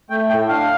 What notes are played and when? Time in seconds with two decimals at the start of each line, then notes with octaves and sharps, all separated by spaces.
0.10 A3 G5
0.29 A2 G5
0.49 D4 F5